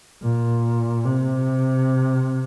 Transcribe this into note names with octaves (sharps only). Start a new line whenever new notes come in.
A#2
C3